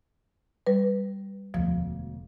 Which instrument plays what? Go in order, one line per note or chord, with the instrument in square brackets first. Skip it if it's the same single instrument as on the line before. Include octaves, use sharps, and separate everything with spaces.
[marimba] G3 B4
[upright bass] E1 D2 [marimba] F3